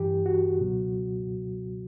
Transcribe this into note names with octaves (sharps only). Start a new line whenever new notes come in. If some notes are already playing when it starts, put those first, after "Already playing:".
Already playing: G2 E3 G4
F#4
C#2 B2 F#3